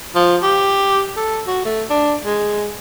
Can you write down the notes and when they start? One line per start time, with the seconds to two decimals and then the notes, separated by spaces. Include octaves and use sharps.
0.15 F3
0.43 G4
1.16 A4
1.47 F#4
1.65 A3
1.90 D4
2.24 G#3